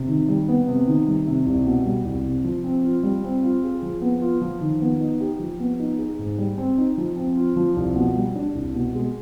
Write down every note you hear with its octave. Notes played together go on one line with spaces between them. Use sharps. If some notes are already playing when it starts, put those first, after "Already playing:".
Already playing: C3
D#3
G3
B3
C3
D#3
G3
C3
C2
B2
G3
C2
C3
F3
C4
F4
G3
C4
F4
G#4
F3
B3
F4
F3
D#3
B3
D#4
G4
F3
B3
D#4
G#4
G#2
G3
C4
D#4
F3
C4
F4
F3
C2
B2
G3
D4
C2
B2
G#3